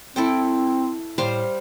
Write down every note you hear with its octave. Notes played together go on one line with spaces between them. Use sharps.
C4 E4 A4 G5
A2 G3 C5 F5